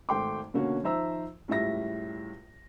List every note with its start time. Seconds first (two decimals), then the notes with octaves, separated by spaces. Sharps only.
0.09 G#1 A3 G5 C6 D6
0.54 B2 D3 A#3 C#4 F#4
0.83 D#3 F3 C5 E5 A#5 E6
1.48 C#2 A2 G3 E5 A#6